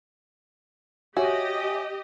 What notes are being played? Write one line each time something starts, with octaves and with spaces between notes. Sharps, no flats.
F#4 G4 C#5 D#5 E5 G#5